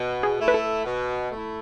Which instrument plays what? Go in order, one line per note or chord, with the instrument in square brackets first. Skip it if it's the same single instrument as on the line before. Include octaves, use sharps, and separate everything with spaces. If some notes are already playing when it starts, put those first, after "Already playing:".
Already playing: [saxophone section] B2
[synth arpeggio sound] G#4
[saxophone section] A3 E4
[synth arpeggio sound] B4
A4
[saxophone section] B2
A3 E4